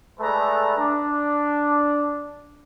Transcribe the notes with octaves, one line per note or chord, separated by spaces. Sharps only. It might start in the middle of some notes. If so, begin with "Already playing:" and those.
G#3 A3 A4 B4 D5 A#5
D4